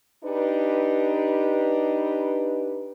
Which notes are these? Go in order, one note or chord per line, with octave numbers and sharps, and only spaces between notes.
D4 D#4 G4 B4